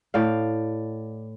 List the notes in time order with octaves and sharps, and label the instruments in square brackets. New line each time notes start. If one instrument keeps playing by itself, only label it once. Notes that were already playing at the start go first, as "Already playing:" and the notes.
[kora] A2 D5 F5